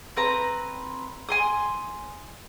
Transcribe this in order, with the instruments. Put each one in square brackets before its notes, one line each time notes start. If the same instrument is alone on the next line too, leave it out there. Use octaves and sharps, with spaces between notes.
[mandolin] C4 B4 A#5
G#5 C6 D#6